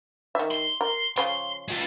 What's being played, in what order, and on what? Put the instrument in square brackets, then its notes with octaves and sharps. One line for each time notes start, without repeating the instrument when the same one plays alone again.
[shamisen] D#3 E5
[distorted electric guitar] C6
[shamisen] A#4
[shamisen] C#3 F3 C#4 [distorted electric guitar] C6
[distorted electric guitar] G#3 F4